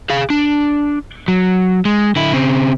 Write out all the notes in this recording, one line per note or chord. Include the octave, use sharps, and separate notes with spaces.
G#4 F5
D4
F#3
G#3
D3 E4
C#3 C4